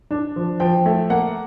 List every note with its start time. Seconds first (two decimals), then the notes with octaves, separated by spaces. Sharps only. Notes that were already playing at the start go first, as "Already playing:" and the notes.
0.11 D4
0.36 F3
0.60 F3 G5
0.86 A3
1.10 A#3 F#5